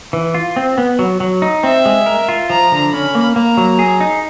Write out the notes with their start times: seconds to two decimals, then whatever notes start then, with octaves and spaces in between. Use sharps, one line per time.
0.13 E3
0.34 F4
0.56 C4
0.78 B3
0.99 F#3
1.20 F#3
1.42 D#4
1.63 C4 E5
1.86 G#3
2.06 A#4
2.29 F4
2.50 F3 A#5
2.72 D3
2.93 C#4 B5
3.15 A#3
3.36 A#3 A#5
3.57 F#3
3.79 G#4
4.01 D#4